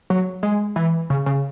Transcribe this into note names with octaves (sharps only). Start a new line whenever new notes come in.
F#3
G#3
E3
C#3
C#3